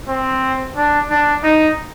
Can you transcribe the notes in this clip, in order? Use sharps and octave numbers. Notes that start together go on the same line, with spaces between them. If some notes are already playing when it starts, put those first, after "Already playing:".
C4
D4
D4
D#4